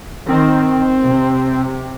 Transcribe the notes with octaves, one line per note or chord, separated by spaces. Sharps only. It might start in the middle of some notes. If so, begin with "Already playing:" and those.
D#3 C4
C3